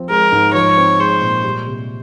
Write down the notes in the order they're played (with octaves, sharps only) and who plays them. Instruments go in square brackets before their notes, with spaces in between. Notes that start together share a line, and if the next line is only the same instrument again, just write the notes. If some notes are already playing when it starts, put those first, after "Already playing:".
Already playing: [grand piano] F3 C4
[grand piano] G#3 [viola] A#4
[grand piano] G#2
[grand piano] F3 [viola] C#5
[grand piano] C4
[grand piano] G#3 [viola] C5
[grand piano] A#2
G3
C3